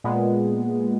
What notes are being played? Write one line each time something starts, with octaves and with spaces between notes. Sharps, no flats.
A#2 G#3 B3